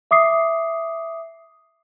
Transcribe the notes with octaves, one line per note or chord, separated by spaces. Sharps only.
E5 D6 D#6 C7